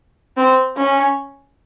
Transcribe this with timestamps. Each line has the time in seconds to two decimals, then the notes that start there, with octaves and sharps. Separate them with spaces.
0.37 C4
0.76 C#4